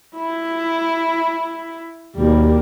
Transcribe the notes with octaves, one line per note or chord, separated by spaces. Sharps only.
E4
D#2 B2 G3 A#3